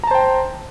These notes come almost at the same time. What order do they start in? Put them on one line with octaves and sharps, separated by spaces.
A#5 A5 C5 G5